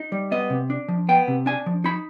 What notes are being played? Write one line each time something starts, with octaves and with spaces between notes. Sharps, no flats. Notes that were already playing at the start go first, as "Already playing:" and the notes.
Already playing: D#4
G3
B3 D#5
C3
D4
F3
B3 G5
C3
D4 G#5
F3
D#4 B5